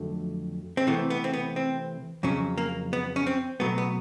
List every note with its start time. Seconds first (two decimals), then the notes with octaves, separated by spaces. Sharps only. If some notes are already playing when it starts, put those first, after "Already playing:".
Already playing: F2 D3 F#3 A3
0.77 C4
0.87 C3 E3 A3 B3
1.10 B3
1.24 C4
1.33 B3
1.56 C4
2.23 F2 C#3 F#3 C#4
2.58 A#3
2.93 B3
3.16 C#4
3.27 C4
3.60 B2 F#3 A3 B3
3.78 B3